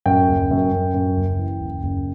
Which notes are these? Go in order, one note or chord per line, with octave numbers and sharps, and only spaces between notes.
F#2 G5
F#1
F#2
F#2
F#2
F#1
E3
F#1
F#1